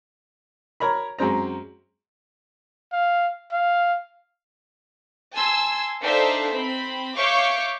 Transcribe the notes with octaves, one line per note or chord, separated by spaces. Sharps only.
A#4 C#5 A#5 B5
F#2 G#3 C4 A#5
F5
F5
G#5 A5 C6 E6 G#6
D4 D#4 A4 C5 E5 F5
C4 B5
C#5 E5 F5 C#6 D6 G6